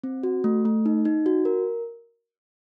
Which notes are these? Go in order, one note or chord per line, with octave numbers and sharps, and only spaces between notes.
C4
F#4
A3
A3
D#4
D#4
F#4
A#4